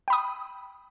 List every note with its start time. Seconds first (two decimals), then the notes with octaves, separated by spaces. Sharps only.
0.08 G5
0.10 B5
0.13 D#6